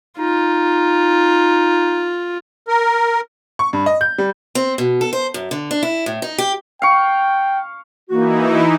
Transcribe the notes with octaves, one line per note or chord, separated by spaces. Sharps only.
D#4 F4
A#4
C#6
G2
D#5
G6
G3
C4
B2
A4
C5
F#2
D3
D4
E4
A2
D#4
G4
F5 G5 C#6
E3 A#3 D#4 E4 F#4